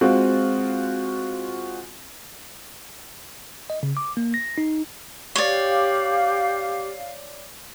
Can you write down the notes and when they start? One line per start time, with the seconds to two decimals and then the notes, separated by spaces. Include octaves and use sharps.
0.01 G#3 C4 F4 F#4
3.70 D#5
3.83 C#3
3.97 D6
4.17 A#3
4.34 A#6
4.58 D#4
5.36 G4 C#5 D5 F5